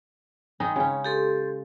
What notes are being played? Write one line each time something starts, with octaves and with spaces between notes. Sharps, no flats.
D#3 G#3 D#4
C#3 C#4
G4 A4 C6